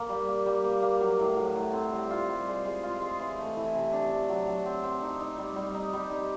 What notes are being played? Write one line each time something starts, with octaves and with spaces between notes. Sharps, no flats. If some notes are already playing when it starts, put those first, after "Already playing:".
Already playing: A#3
G3
A#3
G3
A#3
A#3
F#3
A2
F#3
A2
C4
G3
F4
G3
G#3
G#3
F4
G#3
E3
A3
E3
C3
D4
D4
F#3
F#3
C4
C4
D#4
D#4
G3
G3
D#4
G3
D#4